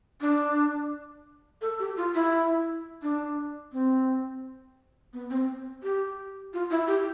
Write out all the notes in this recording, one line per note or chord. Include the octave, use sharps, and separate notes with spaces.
D4
A4
G4
F4
E4
D4
C4
B3
C4
G4
F4
E4
G4